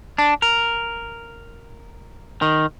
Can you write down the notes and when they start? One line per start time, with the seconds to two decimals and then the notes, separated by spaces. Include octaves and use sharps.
0.18 D4
0.42 A#4
2.42 D#3